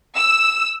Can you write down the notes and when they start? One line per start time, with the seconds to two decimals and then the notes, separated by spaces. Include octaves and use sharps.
0.16 E6